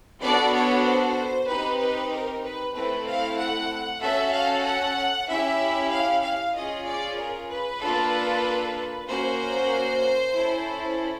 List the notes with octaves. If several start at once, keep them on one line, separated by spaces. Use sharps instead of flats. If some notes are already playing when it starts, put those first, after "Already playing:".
B3 D4 F#4 A4 D5
C#5
C5
C4 D#4 G4 B4
B4
A#4
B4
A3 C4 E4 A4 B4
F5
F#5
C#4 F#4 A4 E5
F5
F#5
C#4 E4 G4 E5
F5
F5
C#4 F4 G#4 D#5
D5
A#4
B4
A#3 D4 F4 A4
A#3 C#4 F#4 C5
C#4 E4 A4